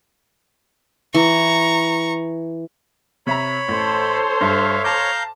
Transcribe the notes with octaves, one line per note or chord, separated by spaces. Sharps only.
E3 A#5 C#6
C3 C#5 E5 A#5 B5
A1 A4 C5 C6
G2 E5 F5
F5 A5 A#5 D6 G6